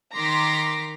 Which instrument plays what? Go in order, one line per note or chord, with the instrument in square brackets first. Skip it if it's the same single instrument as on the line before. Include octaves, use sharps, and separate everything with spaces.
[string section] D#3 A#5 C6 D6 B6